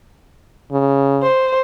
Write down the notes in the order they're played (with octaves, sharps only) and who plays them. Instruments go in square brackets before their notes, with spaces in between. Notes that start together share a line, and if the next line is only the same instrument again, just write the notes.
[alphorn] C#3
[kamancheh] C5